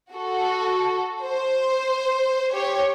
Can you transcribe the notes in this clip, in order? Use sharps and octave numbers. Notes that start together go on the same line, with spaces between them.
F#4 A4
C5
G4 C#5